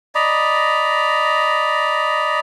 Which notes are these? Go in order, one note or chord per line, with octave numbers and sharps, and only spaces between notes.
D5 D#5 A#5 B5